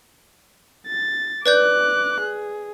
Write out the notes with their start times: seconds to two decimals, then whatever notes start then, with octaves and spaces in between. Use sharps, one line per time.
0.87 A6
1.46 B4 D5 D6 F#6 G6
2.21 G#4